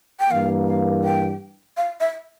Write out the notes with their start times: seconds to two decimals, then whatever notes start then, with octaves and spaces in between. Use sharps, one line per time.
0.20 G5
0.30 G2 E3 A#3 F5
0.67 F5
1.04 G5
1.77 F5
2.00 E5